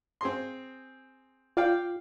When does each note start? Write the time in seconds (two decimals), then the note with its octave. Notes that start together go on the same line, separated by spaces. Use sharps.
0.21 C4 G#4 C6
1.57 F4 D5 F5 G5